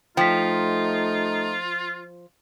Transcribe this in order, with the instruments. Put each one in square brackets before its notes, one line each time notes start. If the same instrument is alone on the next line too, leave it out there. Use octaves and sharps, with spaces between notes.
[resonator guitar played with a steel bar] F3 [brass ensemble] A3 D#4 [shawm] F4 [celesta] G5 B6